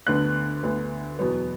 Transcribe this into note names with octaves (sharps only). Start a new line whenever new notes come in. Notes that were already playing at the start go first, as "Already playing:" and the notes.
D2 D3 B3 F#6
D2 D3 B3
E2 B2 F#3 B3